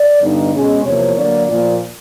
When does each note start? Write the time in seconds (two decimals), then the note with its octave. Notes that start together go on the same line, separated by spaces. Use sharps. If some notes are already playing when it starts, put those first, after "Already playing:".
Already playing: D5
0.21 G2 D3 G3 B3 D#4
0.54 B2 G#3 C#4
0.84 E2 C3 F3 A#3 C#5
1.15 D3 F#3 A#3 D5
1.47 A#2 F3 A#3 D5